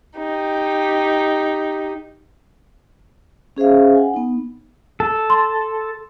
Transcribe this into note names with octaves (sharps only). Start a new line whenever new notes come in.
D#4 G4
C#4 G#4 C5 E5 F5
F#5 G#5
B3 D#4
A4
C6